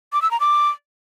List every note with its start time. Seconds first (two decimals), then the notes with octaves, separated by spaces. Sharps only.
0.13 D6
0.22 E6
0.31 A#5
0.40 D6